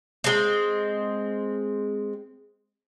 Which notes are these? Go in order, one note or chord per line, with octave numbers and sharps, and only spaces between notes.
G#3 C4